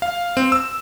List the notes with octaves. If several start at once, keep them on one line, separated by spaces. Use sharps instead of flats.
F5
C4
E6